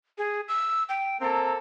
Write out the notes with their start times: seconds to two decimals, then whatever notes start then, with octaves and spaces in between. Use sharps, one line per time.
0.18 G#4
0.48 E6
0.89 G5
1.21 A#3 C4 A4 A#5